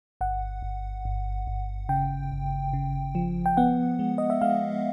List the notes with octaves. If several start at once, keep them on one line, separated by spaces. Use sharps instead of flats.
G1 F#5
G1
G1
G1
C#3 G5
G1
C#3
F3
G5
B3 F#5
G#3
D#5
E5
G#3 F5